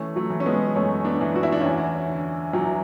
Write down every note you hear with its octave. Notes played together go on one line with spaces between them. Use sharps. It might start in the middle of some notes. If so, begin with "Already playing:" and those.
Already playing: E3 A3 C#4
F#3 A3
E3
C#4
G#3 B3
F#2 A3 C#4
B3 D4
E3
F#4
E4
D4
E2 C#4 E4
D3
E2 F#3